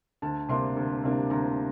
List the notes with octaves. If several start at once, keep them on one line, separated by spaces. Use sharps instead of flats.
D2 A5
C3 G3 A#3 D4 C6
D2
C3 G3 A#3 D4
D2 A#5